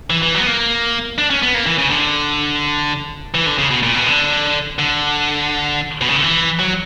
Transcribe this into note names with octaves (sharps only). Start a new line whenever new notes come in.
E3
E3
F#3
B3
A#3
D4
C#4
B3
A#3
E3
C#3
D3
E3
D3
C#3
B2
A#2
B2
D3
D3
B2
C#3
D3
E3
F#3